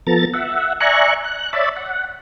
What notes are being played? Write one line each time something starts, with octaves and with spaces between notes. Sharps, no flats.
F3 B3 A4 A#5 A6
E5 F#5
D5 E5 G#5 A#5 C#6 F#6
F#6
C#5 D5 E5 A5 B5
F#5